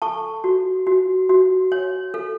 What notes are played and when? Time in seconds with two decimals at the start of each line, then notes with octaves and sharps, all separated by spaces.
0.02 A4 A5 C#6
0.44 F#4
0.87 F#4
1.29 F#4
1.72 C#5
2.14 A4